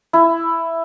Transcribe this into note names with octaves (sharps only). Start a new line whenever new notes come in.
E4